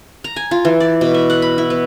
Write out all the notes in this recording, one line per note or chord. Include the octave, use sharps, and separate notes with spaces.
A#5
G#5
F4
E3
D5
B2
E5
F#5
B5
E4
B3